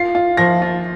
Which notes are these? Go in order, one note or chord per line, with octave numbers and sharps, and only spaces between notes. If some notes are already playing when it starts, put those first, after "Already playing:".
Already playing: F4 C7
F4
F3 A#6
F4